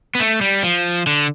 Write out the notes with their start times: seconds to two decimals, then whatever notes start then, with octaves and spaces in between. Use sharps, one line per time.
0.15 B3
0.20 A3
0.41 G3
0.63 F3
1.07 D3